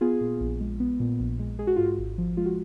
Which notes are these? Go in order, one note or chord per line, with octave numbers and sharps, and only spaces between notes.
B3 F4 G#4
A#2
A#1
G#3
B3
A#2
A#1
G#3
G#3 G#4
F#4
G#2 F4
F#4
G#1
F3
G#3 F4
F#4